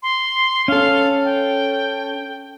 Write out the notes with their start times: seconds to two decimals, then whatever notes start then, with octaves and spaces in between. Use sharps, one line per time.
0.03 C6
0.68 C#4 A4 F5
1.25 G5